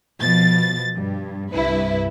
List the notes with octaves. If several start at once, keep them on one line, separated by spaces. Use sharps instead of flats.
B2 F3 A6
G2
C2 G2 E4 B4